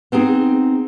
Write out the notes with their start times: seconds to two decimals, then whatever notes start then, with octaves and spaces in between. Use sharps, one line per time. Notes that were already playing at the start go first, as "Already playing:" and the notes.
0.12 B3 C4 D#4 G#4